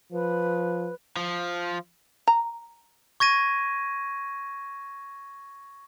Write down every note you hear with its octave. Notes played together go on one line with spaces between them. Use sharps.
F3 B4
F3
A#5
C#6 G#6 A#6 D#7